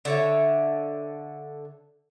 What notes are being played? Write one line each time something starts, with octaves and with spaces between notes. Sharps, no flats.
D3 C#5 E5